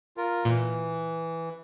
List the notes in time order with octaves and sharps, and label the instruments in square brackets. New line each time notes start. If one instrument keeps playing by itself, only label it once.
[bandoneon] F4 A#4
[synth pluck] A#2 [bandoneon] E3